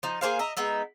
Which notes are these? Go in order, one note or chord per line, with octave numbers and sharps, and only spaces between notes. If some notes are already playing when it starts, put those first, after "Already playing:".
F3 D#4
A#3 G#4 C5 F5
D#5 E5 A#5
G#3 B3 D#4 E5